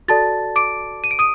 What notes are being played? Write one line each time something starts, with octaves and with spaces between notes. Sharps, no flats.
F#4 A4 D5 A5 A6
D6 D7
D#7
D7
D#6 D#7